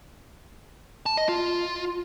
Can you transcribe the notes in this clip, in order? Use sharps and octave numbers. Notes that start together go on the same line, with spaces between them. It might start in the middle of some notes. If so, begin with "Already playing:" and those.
A5
D#5
F4